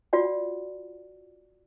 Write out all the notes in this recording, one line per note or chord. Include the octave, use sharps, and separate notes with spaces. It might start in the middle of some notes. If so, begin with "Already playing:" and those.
F4 F#4 D5 F#5